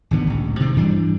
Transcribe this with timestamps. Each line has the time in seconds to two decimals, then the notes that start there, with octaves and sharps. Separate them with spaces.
0.11 G#1 D2 D3 B3
0.27 D1 C#2
0.60 C3 D#3 C4
0.76 G2 E3 G3 D4